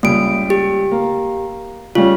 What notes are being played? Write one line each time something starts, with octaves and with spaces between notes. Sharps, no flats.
C#2 G3 A#3 D7
G4
A#3
C#3 G3 C#4 F4